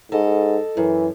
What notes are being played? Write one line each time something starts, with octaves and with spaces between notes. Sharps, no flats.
G#2 A4 D#5
F#2 E3